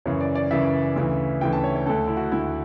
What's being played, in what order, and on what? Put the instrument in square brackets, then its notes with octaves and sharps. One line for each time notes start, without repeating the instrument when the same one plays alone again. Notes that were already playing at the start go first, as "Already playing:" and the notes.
[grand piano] F#2 C#3 E3 C#5
D5
D5
F#2 C#3 E3 E5
D2 C#3 E3
D2 C#3 E3 G5
A5
C#5
C#5
D2 D3 A4
E4
F#4
D2 D3 E4